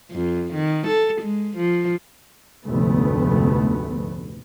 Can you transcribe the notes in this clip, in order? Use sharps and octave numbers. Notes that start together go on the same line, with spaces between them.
F2
D#3
A4
G#3
F3
F1 D2 G#2 A3 B3